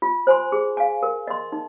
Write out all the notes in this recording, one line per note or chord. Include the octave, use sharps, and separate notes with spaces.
F4
C5 G#5 C6
G#4
F5 G#5
A#4
D#5 C6
D#4